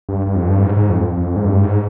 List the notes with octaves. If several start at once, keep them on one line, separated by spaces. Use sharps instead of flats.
G2
G2
F2
G2
G#2
G#2
F2
F2
G#2
G2
G#2